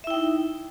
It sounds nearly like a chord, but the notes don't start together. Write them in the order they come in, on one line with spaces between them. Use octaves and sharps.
E5 E4 G5 D#4